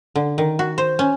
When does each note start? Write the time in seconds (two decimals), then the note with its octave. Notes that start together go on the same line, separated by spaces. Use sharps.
0.16 D3
0.38 D#3
0.59 F#4
0.78 C5
0.99 C#4